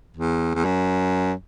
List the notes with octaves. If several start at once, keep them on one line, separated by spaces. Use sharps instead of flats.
E2
E2
F#2